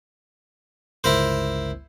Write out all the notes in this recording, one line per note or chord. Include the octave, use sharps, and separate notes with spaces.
G1 C#2 E4 A#4 C5